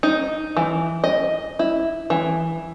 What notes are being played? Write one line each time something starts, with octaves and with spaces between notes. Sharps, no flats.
D#4
E3
D#5
E4
E3